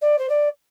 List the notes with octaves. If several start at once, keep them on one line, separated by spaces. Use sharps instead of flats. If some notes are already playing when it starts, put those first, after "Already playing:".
D5
C5
D5